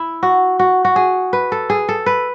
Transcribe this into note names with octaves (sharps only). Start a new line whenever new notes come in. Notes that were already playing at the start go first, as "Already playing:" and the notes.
Already playing: E4
F#4
F#4
F#4
G#4
B4
A4
G#4
A4
B4